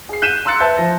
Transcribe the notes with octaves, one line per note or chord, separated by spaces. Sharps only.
G#4 C7
F#6 G6 B6 D#7 E7
A#5 C6 E6 F#6 A6 C#7
B4 E5 A5 G6 A6
F3 C5 A#6